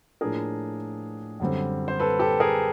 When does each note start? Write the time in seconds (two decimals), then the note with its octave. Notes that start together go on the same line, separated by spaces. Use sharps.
0.21 A2 F3 A#3 D4 G#4 A#4
1.40 F#2 D3 G3 C4
1.88 C5
2.00 A4 B4
2.19 G4 A4
2.40 G#4 A#4